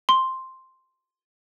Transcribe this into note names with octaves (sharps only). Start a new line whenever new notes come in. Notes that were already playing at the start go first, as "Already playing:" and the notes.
C6